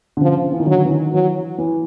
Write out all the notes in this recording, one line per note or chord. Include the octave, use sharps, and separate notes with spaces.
D3
C#3 F3
E3
D#3
D3 F#3
E3
D#3
E3 F#3
E3